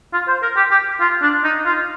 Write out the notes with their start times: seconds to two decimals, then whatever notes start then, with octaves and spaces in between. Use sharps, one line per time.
0.13 F4
0.28 C5
0.42 A#4
0.56 G4
0.71 G4
1.00 F4
1.22 D4
1.44 D#4
1.65 F4